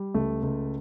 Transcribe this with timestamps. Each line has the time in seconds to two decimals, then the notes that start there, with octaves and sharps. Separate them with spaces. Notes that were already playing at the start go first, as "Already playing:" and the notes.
Already playing: G3
0.14 C#2 A3
0.43 C#2